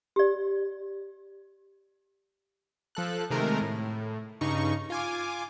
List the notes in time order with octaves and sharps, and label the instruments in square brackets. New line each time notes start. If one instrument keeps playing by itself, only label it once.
[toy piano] G4 D5
[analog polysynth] F3 A4 F#6
C3 D#3 G#3 A3 A#4
A2
G2 C#3 D#4 C#6
F4 G#5 D6